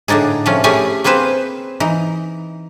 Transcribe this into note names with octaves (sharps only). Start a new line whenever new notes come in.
A2 D3 D4 D#4 G#4
C3 F3 A3 C#4
A3 C#4 E4 G4 G#4 G#5
A#3 C4 G#4 B4 C5
E3 D#4